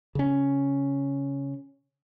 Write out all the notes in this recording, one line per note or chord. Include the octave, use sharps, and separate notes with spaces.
C#3 C#4